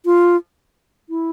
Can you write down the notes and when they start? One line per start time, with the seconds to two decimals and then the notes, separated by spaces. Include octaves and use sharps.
0.05 F4
1.09 E4